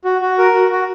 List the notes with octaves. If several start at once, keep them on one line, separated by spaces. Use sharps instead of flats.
F#4
F#4
A#4
F#4
F#4